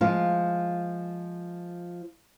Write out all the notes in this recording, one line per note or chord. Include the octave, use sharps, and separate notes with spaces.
F3 G#3 F4